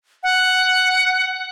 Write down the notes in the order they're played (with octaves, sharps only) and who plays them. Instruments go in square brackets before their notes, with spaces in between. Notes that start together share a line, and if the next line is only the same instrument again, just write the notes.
[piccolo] F#5